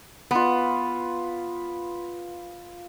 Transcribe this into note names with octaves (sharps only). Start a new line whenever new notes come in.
B3 F4 B4